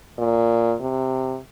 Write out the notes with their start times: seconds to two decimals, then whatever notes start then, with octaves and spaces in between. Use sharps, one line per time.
0.18 A#2
0.81 C3